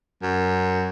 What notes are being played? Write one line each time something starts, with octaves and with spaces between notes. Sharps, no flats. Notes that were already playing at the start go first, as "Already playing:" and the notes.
F#2